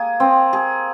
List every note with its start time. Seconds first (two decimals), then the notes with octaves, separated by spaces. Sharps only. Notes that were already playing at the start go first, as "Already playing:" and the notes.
Already playing: A#3 G#4
0.20 C4
0.53 G#4